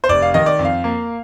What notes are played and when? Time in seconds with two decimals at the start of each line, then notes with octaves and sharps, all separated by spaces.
0.04 C5
0.09 F1 D5
0.22 F5
0.34 D#3 D#5
0.46 D5
0.59 F2
0.65 F5
0.84 A#3